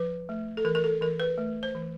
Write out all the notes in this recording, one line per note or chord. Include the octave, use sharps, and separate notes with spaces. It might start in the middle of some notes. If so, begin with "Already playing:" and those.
Already playing: F3 B4
A3
A4
E3 A#4
A#4
A4
E3 A#4
B4
A3
C5
E3